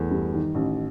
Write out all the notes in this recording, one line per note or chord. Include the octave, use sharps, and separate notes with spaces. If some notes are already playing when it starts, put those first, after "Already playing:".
Already playing: E2 A3
G2
D#3
A1